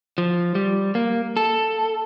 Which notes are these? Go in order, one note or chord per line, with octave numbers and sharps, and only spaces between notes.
F3
G3
A#3
A4